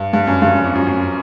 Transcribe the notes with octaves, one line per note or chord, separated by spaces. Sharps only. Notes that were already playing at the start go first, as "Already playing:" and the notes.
Already playing: G2
G2
F#2
G2
F#2
F2
F#2
F#2